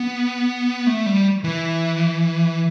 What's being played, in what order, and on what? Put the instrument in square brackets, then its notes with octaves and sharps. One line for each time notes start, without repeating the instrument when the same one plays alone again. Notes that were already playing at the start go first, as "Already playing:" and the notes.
Already playing: [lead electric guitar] B3
A3
G3
E3